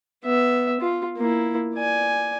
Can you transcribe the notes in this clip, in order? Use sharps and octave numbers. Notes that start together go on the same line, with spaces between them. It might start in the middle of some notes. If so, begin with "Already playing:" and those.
B3 E5
F4
A#3 E4
D5 G#5